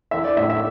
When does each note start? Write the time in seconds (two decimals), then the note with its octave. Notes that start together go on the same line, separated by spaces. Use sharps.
0.11 E3 E5
0.24 D5
0.37 A2 E5
0.50 E5